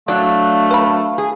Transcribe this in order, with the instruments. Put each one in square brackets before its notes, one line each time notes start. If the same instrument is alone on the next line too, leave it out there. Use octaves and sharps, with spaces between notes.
[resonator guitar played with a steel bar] F#3 D4 [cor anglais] A3 [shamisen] D5 [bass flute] F5
[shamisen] B4 B5
[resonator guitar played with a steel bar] G#4